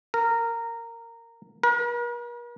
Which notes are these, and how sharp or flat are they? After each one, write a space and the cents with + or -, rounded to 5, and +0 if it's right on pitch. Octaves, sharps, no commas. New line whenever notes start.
A#4 -15
A#4 +45